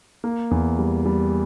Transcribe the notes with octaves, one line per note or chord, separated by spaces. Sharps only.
A#3
E2
G3
G3